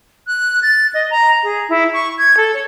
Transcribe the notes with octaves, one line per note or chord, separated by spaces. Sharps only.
F#6
A6
D#5
A#5
G#4
E4
C#6
G#6
A4
C#5